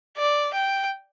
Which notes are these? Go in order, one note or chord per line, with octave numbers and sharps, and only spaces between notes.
D5
G5